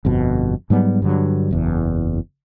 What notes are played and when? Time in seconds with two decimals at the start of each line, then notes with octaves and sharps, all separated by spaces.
0.05 G1 F2 B2
0.70 G#2 F#3 G3 B3
1.02 G2 D3 F#3
1.51 F#1 E2